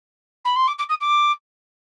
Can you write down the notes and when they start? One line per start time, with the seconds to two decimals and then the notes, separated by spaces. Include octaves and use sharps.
0.45 B5
0.56 C6
0.67 D6
0.78 D6
0.89 D#6
1.00 D6